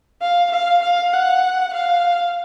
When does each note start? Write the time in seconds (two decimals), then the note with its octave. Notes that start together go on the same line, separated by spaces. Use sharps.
0.22 F5
0.52 F5
0.82 F5
1.13 F#5
1.73 F5